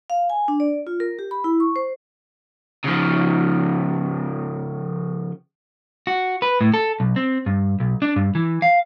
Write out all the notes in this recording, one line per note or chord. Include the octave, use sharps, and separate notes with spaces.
F5
G#5
D4
D5
F4
A#4
G4
B5
E4
C#6
C5
C#3 F3
F#4
B4
A2
A4
B1
C4
G2
B1
D4
G2
E3
F5